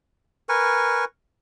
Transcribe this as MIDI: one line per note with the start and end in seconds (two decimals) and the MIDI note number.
0.49 1.05 70
0.49 1.05 71
0.49 1.05 80
0.49 1.05 85